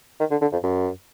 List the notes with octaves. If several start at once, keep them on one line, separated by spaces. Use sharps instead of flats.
D#3
D3
D3
F2
F#2